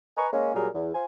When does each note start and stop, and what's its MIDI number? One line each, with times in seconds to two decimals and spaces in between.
0.17 0.27 71
0.17 0.27 75
0.17 0.27 80
0.17 0.27 82
0.17 0.27 85
0.33 0.51 56
0.33 0.51 58
0.33 0.51 61
0.55 0.68 46
0.55 0.68 54
0.55 0.68 55
0.55 0.68 68
0.55 0.68 70
0.74 0.90 40
0.94 1.05 65
0.94 1.05 72
0.94 1.05 80